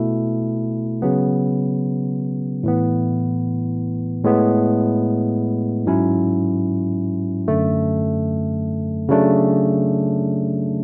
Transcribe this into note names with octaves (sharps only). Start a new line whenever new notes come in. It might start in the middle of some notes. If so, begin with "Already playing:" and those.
Already playing: B2 A3 E4
C#3 F#3 B3
A2 E3 B3
A2 G#3 B3
G#2 F#3 C#4 E4
F#2 D3 A3
C#3 F#3 A3 D4